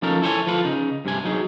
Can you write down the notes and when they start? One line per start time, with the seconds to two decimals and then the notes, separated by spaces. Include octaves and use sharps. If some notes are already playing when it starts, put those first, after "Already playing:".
0.02 F3 C#4 D#4 A4 A#4
0.22 E4 A4 C5 C#5 E5 G#5
0.47 F3 F4 A4 B4
0.64 C#3 D#4
1.05 G2 C3 G#5
1.25 F#3 D#4 G#4